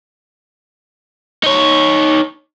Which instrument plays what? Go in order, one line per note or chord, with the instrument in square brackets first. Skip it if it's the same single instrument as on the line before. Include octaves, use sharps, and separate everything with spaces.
[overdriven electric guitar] D#4 C#5